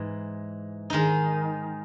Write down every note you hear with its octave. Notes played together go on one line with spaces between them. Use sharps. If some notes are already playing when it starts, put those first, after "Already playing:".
Already playing: G#2 E3 G#3 D#4
D#3 G#3 D#4